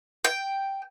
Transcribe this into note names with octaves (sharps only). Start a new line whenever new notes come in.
G5